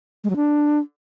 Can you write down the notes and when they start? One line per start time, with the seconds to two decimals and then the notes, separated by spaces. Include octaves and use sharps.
0.24 G#3
0.30 F#3
0.36 D4